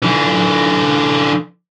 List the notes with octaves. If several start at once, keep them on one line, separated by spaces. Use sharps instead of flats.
D3 E3